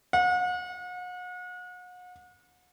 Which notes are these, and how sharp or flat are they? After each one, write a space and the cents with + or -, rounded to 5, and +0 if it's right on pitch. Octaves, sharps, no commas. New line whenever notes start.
F#5 -40